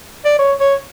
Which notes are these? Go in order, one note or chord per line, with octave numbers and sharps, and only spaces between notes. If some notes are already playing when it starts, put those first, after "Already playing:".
D5
C#5
C#5